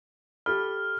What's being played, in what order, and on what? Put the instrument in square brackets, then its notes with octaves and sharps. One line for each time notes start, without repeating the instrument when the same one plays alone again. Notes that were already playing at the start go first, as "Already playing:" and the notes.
[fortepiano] G4 A4 B5 [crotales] F6